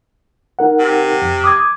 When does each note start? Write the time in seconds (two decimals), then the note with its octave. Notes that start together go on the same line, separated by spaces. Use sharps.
0.59 D#4 A#4 F#5
0.79 C3
1.22 F2
1.44 D6 D#6 G#6